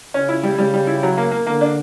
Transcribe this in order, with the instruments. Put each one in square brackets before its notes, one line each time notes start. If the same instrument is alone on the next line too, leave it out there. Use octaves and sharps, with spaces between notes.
[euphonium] C#3 [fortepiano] C#4
[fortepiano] E4
G3
[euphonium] C#3 [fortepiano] G3
[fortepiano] G3
E4
F#3
A#3
A#3
[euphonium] D3 [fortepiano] A#3
[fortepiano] D4